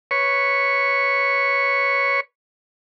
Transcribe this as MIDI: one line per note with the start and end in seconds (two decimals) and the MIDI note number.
0.11 2.20 71
0.11 2.20 73
0.11 2.20 85